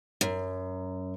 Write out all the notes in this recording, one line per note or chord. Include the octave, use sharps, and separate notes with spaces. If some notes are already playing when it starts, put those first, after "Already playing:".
F#2